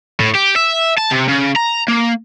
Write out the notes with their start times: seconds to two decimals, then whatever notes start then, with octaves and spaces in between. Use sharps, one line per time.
0.20 A2
0.35 G4
0.56 E5
0.98 A5
1.12 C3
1.29 C#3
1.56 A#5
1.88 A#3